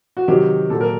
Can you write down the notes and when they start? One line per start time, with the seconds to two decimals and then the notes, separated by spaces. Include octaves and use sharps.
0.17 F#4
0.28 C3 D#3 F#3 G4
0.70 A#2 F#3 A4
0.81 A#4